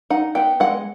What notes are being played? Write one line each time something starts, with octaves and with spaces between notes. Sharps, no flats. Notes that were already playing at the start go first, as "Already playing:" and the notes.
D#4 F#5
B3 G5
G#3 F#5